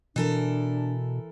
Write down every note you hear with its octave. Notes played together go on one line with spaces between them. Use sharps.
B2 E3 D4 A4 A#4